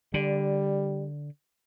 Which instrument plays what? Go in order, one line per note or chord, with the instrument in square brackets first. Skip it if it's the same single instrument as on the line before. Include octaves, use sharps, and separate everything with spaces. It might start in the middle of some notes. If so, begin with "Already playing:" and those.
[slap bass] D3 [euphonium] G3